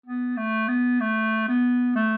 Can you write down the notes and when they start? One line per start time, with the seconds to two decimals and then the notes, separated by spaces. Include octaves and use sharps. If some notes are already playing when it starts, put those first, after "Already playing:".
0.06 B3
0.37 A3
0.68 B3
1.00 A3
1.48 B3
1.95 A3